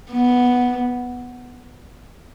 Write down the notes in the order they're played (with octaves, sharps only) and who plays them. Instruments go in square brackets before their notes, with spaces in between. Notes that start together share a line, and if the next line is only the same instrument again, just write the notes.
[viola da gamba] B3